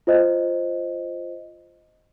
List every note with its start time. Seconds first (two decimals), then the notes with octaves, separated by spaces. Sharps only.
0.07 F4 C5 D#5